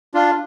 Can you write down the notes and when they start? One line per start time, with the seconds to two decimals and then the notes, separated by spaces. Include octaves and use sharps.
0.14 D4 F4